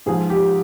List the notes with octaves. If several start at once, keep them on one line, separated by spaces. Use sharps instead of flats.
G#2 F3 G#4
G4